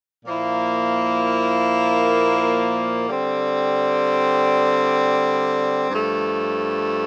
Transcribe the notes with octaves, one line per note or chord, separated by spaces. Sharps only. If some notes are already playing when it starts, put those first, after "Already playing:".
A#2 F3 A#3 E4
D3 G3 C4
G2 F3 A3